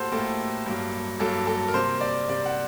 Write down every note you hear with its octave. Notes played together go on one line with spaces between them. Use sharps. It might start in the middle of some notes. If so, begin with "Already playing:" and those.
Already playing: A2 G3 A#3 F#4 A4 C5
A2 G3 A#3 A4
G2 F#3 A#3
G2 F#3 A#3 A4
A4
A#4
C3 G3 A#3 C5
D5
C3 G3 A#3 D5
F#5